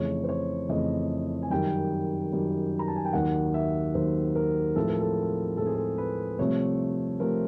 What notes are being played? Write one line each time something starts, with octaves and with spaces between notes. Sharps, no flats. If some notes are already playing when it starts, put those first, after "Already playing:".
Already playing: F2 C#3 E3 A3 C#5
C5
C#5
F2 C#3 E3 A3 D#5
G#5
F#2 D#3 G3 G5
F#2 D#3 G3
A#5
A5
G#5
G5
D#2 D#3 F#3 F#5
E5
D#2 D#3 F#3 C5
A#4
A2 F3 G#3 C4 A4
A#4
A4
A2 F3 G#3 C4 A4
G#4
A4
B4
C2 C3 F3 A3 C4 C#5
C3 F3 A3 C4 A#4